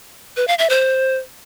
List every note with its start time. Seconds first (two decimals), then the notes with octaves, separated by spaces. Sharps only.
0.37 B4
0.48 F5
0.59 E5
0.70 C5